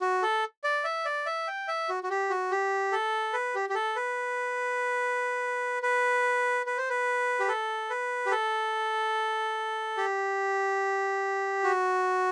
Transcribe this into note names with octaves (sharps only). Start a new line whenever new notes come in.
F#4
A4
D5
E5
D5
E5
G5
E5
F#4
F#4
G4
F#4
G4
A4
B4
G4
G4
A4
B4
B4
B4
C5
B4
G4
A4
B4
G4
A4
G4
F#4